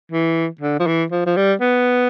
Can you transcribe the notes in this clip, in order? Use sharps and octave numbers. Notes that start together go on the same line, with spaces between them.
E3
D3
F3
E3
F3
F3
G3
B3